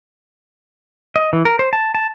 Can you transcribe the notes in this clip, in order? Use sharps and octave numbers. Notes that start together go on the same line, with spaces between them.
D#5
E3
A#4
C5
A5
A5